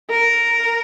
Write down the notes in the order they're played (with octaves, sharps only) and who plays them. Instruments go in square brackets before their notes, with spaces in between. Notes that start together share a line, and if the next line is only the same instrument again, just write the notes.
[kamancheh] A#4